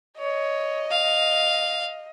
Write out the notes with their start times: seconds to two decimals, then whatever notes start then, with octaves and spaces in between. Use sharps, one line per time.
0.19 C#5 D#5
0.91 F5